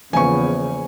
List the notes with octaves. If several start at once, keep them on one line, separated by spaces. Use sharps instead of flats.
E2 C#3 F3 A#3 B3 G#5 C#6